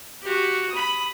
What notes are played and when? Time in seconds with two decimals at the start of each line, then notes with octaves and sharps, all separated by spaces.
0.22 F#4 G4
0.70 B5 D#6